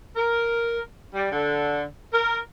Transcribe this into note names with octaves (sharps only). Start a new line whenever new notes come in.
A#4
G3
D3
A#4